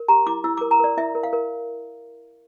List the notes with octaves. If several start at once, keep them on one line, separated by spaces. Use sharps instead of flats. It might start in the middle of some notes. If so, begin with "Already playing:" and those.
Already playing: A#4
G4 A#5
E4 D6
E4 E6
A#4 D6
A#5
A#4 D5
E4 E5
A#4
F5
A#4